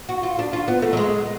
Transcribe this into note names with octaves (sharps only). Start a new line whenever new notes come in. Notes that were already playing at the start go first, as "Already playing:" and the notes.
F#4
F4
D4
F4
B3
A3
F#3
G#3